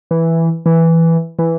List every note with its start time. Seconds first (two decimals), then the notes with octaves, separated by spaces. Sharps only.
0.11 E3
0.66 E3
1.39 E3